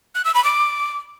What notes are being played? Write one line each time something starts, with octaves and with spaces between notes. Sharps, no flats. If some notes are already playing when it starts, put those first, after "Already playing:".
F#6
E6
B5
D6